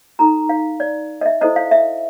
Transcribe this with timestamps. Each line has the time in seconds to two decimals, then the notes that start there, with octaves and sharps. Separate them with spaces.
0.19 D#4 F#4 A4 A#5
0.49 F5
0.80 D5
1.21 D#5
1.26 E5
1.41 E4 A4 C5 D#5
1.56 F5
1.71 E5